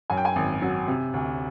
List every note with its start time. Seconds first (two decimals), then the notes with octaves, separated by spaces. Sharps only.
0.10 F#2 G#5
0.17 G5
0.25 G#5
0.36 G#1
0.62 F#3
0.88 C3
1.14 D2